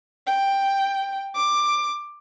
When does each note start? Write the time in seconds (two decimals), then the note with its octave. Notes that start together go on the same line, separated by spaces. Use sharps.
0.27 G5
1.35 D6